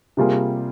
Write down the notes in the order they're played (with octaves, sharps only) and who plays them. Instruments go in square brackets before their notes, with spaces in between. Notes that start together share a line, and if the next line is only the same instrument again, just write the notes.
[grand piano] C3 G3 A#3 F4 G#4